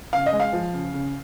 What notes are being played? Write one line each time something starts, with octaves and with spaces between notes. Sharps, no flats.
C#3 F5
D#5
G#3
F5
F3
C#3
C#3